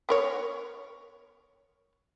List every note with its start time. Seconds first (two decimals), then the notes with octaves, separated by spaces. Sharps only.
0.09 B3 A#4 C#5